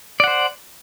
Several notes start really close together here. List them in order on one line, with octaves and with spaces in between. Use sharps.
D5 F#5 C5